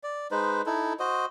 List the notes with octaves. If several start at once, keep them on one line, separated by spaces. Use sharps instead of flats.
D5
G#3 D#4 B4 C5
D#4 E4 A4
F#4 C5 D#5